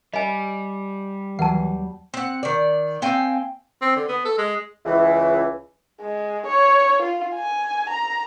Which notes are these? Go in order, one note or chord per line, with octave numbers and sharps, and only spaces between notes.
G3 D#5 G#5
D#2 E3 F#3 F#5 A5
C4 F#5
D#3 D5
C4 F5 G5 G#5
C4
D3
B3
A4
G#3
C#2 E3
G#3
C#5
F4
G#5
A#5